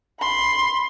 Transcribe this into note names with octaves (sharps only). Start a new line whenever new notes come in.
B5 C6